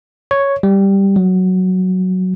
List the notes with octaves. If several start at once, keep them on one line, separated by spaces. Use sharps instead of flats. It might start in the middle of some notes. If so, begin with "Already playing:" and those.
C#5
G3
F#3